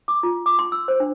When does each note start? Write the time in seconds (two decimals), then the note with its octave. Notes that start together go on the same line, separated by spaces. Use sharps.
0.08 D6
0.23 F4
0.46 D6
0.59 C6
0.72 E6
0.88 C5
1.00 D4